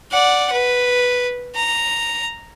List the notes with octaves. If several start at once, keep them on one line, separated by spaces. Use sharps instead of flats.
D5 F#5
B4
A#5